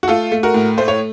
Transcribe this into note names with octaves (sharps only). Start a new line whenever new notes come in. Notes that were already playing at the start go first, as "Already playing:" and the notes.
F#4
A3 F4 A4
A3
F#4 A#4
A2
A3 C5
C#5